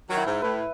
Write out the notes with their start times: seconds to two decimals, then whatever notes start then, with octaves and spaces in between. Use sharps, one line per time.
0.09 D#3 F#3
0.17 E4
0.26 G#2
0.42 A2 B4